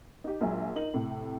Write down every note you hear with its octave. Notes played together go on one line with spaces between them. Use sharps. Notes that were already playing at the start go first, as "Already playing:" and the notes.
D#4 G4
A#1 F#3 G#3 G#4 E5 G#5
D#4 A#4 F#7
A2 C3